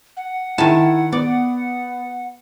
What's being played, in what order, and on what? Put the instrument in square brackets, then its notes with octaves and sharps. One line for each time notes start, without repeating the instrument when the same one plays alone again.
[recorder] F#5
[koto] D#3 A5 [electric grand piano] E4
[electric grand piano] B3 [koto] D5